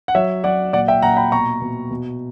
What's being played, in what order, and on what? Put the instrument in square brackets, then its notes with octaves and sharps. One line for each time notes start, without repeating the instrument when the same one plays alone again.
[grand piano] F#5
F#3 C#5 E5
F#3 D5 F#5
A#2 D5 F#5
E5 G5
A#2 F#5 A#5
G5 B5
B2 A#5 C#6
B2
B2